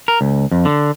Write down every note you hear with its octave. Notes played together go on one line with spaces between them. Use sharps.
A#4
C#2
F2
D3